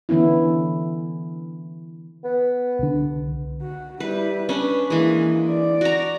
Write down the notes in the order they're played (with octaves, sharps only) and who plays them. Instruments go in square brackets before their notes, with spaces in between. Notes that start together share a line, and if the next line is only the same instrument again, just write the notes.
[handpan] D3 E3 B3 C#4 E4
[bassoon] B3
[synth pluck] C2 D3
[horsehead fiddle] F#4
[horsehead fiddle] G3 E4 [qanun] B4
[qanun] C#4 D4 [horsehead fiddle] B4
[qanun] E3 G#3 [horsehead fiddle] A#3
[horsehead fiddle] D5
[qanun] F#4 A#5